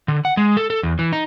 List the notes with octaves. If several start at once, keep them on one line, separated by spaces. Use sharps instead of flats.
D3
F#5
G#3
A4
A4
E2
E3
D#4